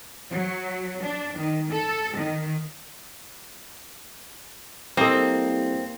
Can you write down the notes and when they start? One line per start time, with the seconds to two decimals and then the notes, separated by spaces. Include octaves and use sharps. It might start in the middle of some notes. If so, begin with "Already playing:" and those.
0.31 F#3
1.02 D4
1.38 D#3
1.71 A4
2.17 D#3
4.97 C2 A#3 C4 A4 A#4 D#5